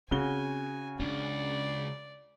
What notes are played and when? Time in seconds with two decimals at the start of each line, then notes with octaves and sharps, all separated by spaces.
0.11 C#3 C4 F#4 G#5 G7
1.00 C#2 C#4 D4 D5